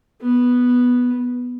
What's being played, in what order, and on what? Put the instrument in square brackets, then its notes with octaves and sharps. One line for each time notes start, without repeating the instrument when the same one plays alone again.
[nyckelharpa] B3